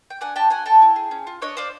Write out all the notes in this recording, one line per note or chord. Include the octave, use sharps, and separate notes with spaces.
G5
D4 F#5 G#5
G4 G5 A5
F#4 F#5 G#5
A4 G5 A5
E4
G#4
C#4
F4
D4 C#5 D#5
F4 C5 D5